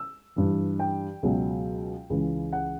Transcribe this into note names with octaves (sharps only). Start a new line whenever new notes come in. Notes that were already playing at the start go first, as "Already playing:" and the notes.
Already playing: E6
G2 E3
G5
C#2 B2 F#3
C#2 C#3 E3
F#5